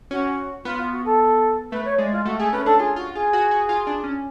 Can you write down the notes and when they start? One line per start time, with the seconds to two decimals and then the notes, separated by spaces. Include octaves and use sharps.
0.11 C#4 F#4
0.64 B3 F4
0.78 F4
0.92 F#4
1.05 A4
1.71 A3 B4
1.85 C#5
1.98 G#3 D5
2.12 F4
2.25 A3 F#4
2.39 A3 G#4
2.52 C#4 B4
2.66 D4 A4
2.79 F4 G#4
2.96 F4 F#4
3.14 F4 G#4
3.33 F#4
3.51 F#4
3.69 F4
3.87 D4
4.04 C#4